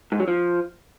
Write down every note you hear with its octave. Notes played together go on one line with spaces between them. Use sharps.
G#2
F#3
F3